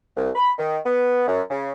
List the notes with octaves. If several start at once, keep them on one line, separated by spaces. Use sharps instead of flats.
C2
B5
D#3
B3
F#2
C#3